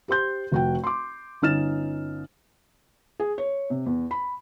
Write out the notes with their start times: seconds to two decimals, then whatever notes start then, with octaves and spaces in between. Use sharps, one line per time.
0.08 G4 C5 C6 G6
0.52 F1 F#4 G5
0.84 C6 D6
1.42 G1 C#4 D#4 F6 A6 E7
3.20 G#4
3.38 C#5
3.70 C3
3.86 E2
4.11 B5